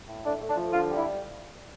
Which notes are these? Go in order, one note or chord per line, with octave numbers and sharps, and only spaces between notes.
A2
A3 D4
A3
D4
F3
D3 F4
G3
E4